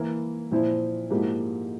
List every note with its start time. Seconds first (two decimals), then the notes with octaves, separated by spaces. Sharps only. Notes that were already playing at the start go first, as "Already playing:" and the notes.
Already playing: E3 A#3 E4 A#4
0.51 A#2 F3 C4 E4
1.10 G#2 F3 A#3 E4 G4